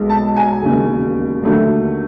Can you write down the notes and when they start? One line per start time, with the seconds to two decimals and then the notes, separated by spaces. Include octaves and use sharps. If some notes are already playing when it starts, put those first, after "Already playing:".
Already playing: B1 B2 G#3
0.09 A5
0.36 G#5
0.62 E1 D#2 C#3
1.42 D#2 D3 F#3 A3